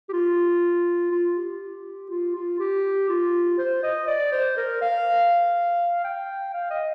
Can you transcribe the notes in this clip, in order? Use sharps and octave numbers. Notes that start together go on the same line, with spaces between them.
G4
F4
F4
G4
F4
F4
G4
F4
C5
D#5
D5
C5
A#4
F5
G5
F5
D#5